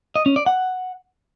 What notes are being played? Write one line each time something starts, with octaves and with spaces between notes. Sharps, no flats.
D#5
C#4
D5
F#5